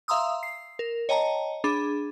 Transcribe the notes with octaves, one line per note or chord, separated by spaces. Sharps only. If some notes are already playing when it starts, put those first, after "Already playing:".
E5 F5 A#5 C6 D#6 E6
C7
A#4
C#5 D#5 G5 A5 A#5
D4 G#4 B5